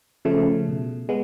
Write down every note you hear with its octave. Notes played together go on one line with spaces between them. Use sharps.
C#3 F3 A3
B2
G#3 B3